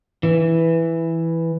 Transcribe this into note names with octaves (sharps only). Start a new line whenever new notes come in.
E3